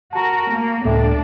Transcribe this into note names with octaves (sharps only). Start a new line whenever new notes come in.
F#4 A#4 A5 A#5
A#3
C#2 A2 D4 A4 E5 G5